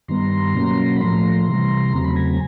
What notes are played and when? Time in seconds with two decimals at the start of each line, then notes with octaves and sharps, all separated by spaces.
0.08 G2 D#3 G3 B3 A#5 C6
0.55 B2 F#3 A#3 C#4
0.96 B5
1.01 A2 F3 A3 A#5 C6
1.47 C3 E3 G3
1.93 E2 C#3 F#3 A3 C4 A#5
2.05 B5
2.16 G#5 A#5